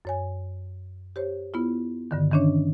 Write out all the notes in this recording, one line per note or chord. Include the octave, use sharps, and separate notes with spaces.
F#2 C#5 G#5
G4 C5 C#5
B3 E4 F4
G2 D3 D#3
D#3 E3 C#4 D4 C#5